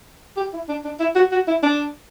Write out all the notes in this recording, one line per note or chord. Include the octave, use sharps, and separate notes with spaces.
G4
E4
D4
D4
E4
F#4
F#4
E4
D4